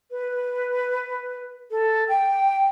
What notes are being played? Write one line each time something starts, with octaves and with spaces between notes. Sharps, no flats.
B4
A4
G5